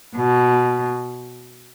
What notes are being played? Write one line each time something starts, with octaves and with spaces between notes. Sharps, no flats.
B2